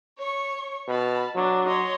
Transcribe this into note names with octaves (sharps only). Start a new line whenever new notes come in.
C#5 C#6
B2 A5 B5 F6
F#3 D4
C#5 D#5 C6